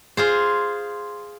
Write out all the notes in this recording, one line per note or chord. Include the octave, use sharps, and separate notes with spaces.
F4 G#4 C5